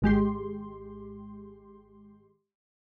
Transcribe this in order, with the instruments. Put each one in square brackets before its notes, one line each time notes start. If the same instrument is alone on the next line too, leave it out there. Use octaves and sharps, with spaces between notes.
[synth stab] G#1 G#3 G4 C6